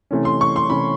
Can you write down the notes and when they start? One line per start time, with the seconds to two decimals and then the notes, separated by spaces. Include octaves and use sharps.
0.11 C3 E3 A3 C#4
0.25 C6
0.41 C#6
0.56 C6
0.70 C3 E3 A3 C#4 B5